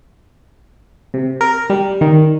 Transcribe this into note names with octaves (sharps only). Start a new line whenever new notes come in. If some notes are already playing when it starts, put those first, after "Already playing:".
C3
A#4
G3
D#3